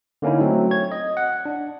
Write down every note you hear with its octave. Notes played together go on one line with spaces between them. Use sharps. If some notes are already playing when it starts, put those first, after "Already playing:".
D3 A#3 C#4 D#4 E4
F#3 A3 C4
C#5 G#6
D#5
F#5
D4